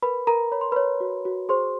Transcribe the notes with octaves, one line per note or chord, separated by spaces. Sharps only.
A#4 B4 B5
A#4 A#5
C#5 B5
C6
B4 C#5 B5
F#4
F#4
G#4 C5 C6